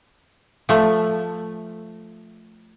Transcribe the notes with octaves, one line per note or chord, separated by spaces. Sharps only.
F3 A3